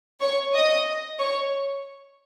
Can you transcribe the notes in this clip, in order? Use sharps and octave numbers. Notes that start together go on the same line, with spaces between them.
C#5 C#6
D#5 D#6
C#5 C#6